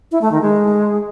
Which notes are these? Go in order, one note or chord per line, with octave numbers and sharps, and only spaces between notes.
E4
A3
D#3
G#3